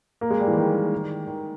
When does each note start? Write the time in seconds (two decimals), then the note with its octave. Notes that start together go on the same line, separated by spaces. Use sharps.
0.21 A#3
0.30 G#3
0.40 G3
0.47 E3
0.57 D#3
1.27 D#3